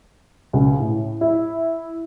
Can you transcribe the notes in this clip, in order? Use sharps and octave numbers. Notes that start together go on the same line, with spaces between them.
C#2
A2
E4